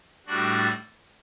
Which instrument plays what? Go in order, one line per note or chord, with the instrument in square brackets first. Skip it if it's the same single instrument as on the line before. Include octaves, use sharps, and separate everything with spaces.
[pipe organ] A2 G3 D4 F#4